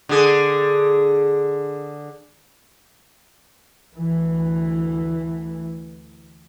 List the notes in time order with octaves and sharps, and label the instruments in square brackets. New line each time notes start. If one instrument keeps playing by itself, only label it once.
[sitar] D3 G#4
[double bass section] D2 E3